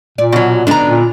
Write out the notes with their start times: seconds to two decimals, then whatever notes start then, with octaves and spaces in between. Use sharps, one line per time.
0.18 A#2 D5
0.33 B2 F#3
0.67 D3 B3 D4 D#4 A#5
0.88 A#2